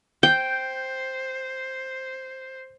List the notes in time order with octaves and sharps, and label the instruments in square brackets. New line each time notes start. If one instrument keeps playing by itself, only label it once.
[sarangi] C5 [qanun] G5 [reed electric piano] G6